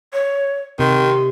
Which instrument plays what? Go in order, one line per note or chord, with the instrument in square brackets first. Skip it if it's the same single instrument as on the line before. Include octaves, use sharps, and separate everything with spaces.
[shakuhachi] C#5
[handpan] C3 [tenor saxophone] D#3 [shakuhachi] C6